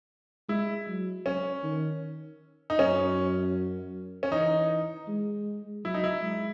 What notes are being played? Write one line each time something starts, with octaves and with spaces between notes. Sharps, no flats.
G#3 E4
F#3
C#4
D#3
D#4
F#2 C#4
C#4
E3 D#4
G#3
F#3 E4
D#4
E4
G#3